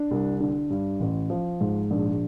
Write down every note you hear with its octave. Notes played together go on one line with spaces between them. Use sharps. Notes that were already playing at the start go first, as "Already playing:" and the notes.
Already playing: D4
C2
D3
G2
A1
F3
G#2
A#1